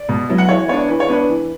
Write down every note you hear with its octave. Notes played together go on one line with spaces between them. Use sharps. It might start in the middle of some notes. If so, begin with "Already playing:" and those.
Already playing: D5
B2
F#3 B3 E4
F#5
E3 C#5 E5
B3 D4 C#5
E3 B4
C#5
B3 D4 B4
E3